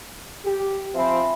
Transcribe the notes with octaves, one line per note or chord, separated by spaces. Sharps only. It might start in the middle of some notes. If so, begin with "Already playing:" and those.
G4
F3 C4 E5 G#5 B5